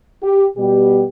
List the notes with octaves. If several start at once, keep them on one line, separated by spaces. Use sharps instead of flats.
G4
B2 G3 B3 G4